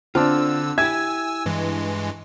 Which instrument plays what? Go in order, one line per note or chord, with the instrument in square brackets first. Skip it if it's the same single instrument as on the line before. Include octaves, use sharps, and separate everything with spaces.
[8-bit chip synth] D3 E6 [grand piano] C4 D4 [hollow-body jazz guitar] F4
[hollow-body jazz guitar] E4 G4 E5 [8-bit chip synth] G#5 E6 [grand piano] G#6
[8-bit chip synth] G2 E3 G#3